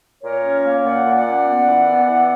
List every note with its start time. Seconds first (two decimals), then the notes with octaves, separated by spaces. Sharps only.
0.23 A#2 A#4 C#5
0.44 C#4
0.65 A#3
0.85 A#2 D5 F#5
1.05 A#2
1.16 D5 F#5
1.26 C#4
1.46 B3
1.67 E3
1.87 B3
2.08 E3